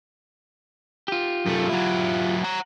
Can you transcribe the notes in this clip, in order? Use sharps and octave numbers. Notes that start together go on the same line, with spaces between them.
F4 G4
F#2 A3
F#3 E4
F#5 A#5